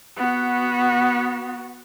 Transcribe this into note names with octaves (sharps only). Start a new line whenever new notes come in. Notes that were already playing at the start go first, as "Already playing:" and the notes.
B3 F#4